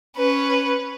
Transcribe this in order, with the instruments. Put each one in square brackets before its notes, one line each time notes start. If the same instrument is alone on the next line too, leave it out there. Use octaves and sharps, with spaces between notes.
[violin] C#4 B4